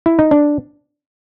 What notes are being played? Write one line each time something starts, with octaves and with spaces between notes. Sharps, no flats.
E4
D#4
D4